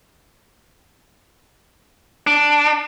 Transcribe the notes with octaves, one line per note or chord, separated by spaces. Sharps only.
D4